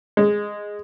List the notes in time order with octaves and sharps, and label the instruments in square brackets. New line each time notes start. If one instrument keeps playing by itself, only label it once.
[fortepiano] G#3